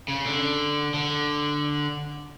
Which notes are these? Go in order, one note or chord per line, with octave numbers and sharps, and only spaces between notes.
C#3
D3
D3